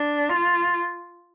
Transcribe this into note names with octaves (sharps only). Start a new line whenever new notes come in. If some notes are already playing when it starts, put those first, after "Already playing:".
Already playing: D4
F4